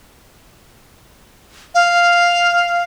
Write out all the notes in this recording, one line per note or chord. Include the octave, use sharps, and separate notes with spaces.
F5